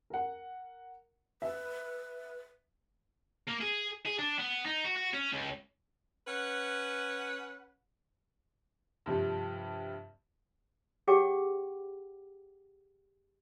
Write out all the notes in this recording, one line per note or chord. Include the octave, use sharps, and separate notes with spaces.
A#4 F#5
B4 E5
A#3
G#4
G#4
D4
B3
D#4
F#4
F#4
C#4
C#2
C#4 B4 F#5
G2 C3 F3 G3
G4 G#4 C#5 F#5 G5 D6